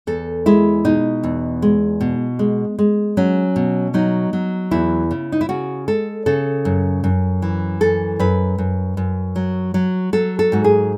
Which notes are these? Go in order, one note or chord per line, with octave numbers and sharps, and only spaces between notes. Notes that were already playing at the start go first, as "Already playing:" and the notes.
E2 A4
G#3 E4
B2 D#4
E2
G#3
B2
G#3
G#3
F#3 C#4
B2
F#3 D#4
F#3
E2 E4
C#3
D#4
E4
C#3 F#4
G#3 A4
C#3 A4
F#2
F#2
E3
F#2 A4
F#2 B4
F#2
F#2
F#3
F#3
F#3 A4
A4
G#2 F#4
G#4